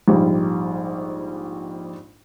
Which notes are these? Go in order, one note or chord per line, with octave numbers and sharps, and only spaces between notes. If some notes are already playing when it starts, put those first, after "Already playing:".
A#1 G#2 G3